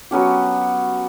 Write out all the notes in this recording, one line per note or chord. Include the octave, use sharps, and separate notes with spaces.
F#3 B3 C#4 G4